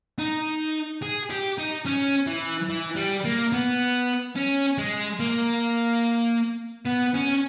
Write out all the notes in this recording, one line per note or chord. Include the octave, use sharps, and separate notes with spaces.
D#4
G#4
G4
D#4
C#4
E3
E3
G3
A#3
B3
C#4
G#3
A#3
B3
C#4